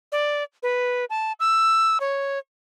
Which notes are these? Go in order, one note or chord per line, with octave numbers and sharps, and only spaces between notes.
D5
B4
A5
E6
C#5